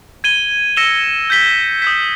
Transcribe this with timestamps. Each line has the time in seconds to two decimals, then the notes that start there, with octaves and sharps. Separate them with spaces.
0.24 G#6 D#7 G7
0.77 E6 A#6 C#7 E7 G7
1.30 G6 B6 G7
1.82 D#6 G6 B6